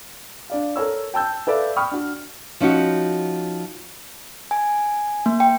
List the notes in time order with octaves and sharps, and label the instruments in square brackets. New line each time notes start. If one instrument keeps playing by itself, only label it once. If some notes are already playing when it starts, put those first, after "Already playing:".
[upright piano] D4 D5 F5
A4 A#4 C#5 E6
G5 A5 E6 G6
A4 B4 D5 E5 F5
G5 B5 C#6 D#6 F6
D4 F#4
[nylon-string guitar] F3 C#4 D#4 F#4
[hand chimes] G#5
A#3
G5